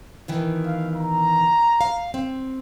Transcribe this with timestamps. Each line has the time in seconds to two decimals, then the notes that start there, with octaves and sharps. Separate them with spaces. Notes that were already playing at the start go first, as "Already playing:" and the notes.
0.28 B2 D#3 E3
0.66 F5
0.95 A#5
1.81 F5
2.14 C4